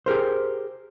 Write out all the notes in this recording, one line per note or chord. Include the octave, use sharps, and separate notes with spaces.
G4 G#4 A#4 C5